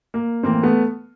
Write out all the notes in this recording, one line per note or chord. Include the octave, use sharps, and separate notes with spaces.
A#3
A2 E3 A#3 C4
A3 B3